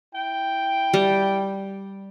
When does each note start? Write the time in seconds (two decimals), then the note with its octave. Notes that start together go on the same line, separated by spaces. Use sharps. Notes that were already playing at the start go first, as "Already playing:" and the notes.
0.14 E4 G5
0.94 G3